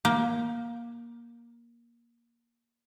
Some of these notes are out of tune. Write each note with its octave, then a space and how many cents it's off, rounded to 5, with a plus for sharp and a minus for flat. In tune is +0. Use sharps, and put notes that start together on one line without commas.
A#3 +15